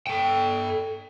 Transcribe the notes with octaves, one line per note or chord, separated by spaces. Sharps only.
A4 G5